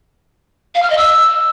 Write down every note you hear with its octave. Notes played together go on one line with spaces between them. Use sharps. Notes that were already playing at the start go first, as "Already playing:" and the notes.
F5
F6
D#5
E6